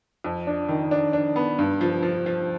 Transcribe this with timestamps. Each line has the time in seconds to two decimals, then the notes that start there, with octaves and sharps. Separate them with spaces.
0.24 F2
0.47 D4
0.69 D#3
0.91 D4
1.13 D4
1.36 B3
1.59 G2
1.81 F3
2.03 F3
2.26 F3